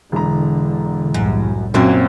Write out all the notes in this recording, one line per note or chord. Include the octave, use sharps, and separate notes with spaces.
E1 D3 A#5
C2 F#2 A2
F#2 A#2 F#3 A#3 C4